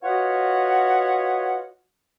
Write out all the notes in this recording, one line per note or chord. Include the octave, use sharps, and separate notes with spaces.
F4 F#4 B4 C#5 D#5 F#5